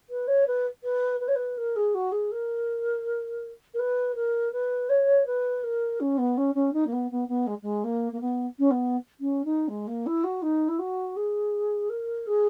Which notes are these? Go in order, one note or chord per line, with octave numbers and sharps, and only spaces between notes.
B4
C#5
B4
B4
B4
C#5
B4
A#4
G#4
F#4
G#4
A#4
A#4
B4
A#4
B4
C#5
B4
A#4
C#4
B3
C#4
C#4
D#4
A#3
B3
B3
B3
G#3
G#3
A#3
A#3
B3
C#4
B3
C#4
D#4
G#3
A#3
E4
F#4
D#4
E4
F#4
G#4
A#4
G#4